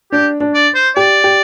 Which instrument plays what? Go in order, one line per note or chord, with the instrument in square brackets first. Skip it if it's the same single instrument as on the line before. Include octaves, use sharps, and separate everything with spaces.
[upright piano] D4 [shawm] G4
[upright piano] D4
[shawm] D5
C5
[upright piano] G4 [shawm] D5
[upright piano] G4